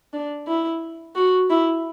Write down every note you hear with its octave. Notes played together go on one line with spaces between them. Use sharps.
D4
E4
F#4
E4